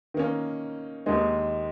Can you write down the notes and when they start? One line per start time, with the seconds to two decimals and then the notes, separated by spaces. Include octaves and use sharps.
0.14 D#3 A#3 C#4
1.06 D#2 D#3 G#3 D#4